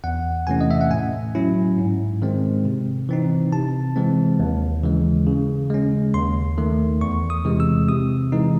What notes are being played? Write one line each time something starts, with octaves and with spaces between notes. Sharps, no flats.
E2 F#5
C3 E3 A3 C#4 G#5
D#5
E5
F#5
A2 G#5
F#3 C#4 E4
G#2
D#3 G#3 C4
C3
E3 C4 D#4
C3 A5
E3 G#3 C4
D#2
C#3 E3 G#3
C#3
G#3 C#4
D#2 C6
D#3 A3
E2 C#6
D#6
C3 E3 G#3
E6
C3 D#6
E3 G#3 D#4